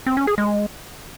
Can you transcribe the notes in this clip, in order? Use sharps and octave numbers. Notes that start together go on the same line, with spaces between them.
C4
C#4
G#4
G#3